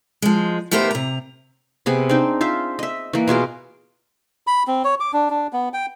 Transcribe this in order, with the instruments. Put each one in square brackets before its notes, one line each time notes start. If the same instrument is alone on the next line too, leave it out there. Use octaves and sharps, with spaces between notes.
[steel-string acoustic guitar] F3 G#3
D#3 A3 B3 G4 A#4 C5
C3 A#5
[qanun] C3 B3 G#4
C4 D4 D#4
F4 C5 E5
D#5 E5
E3 A#3
B2 F4 G#4 A#4
[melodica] B5
C4
C#5
D6
D4
D4
B3
G5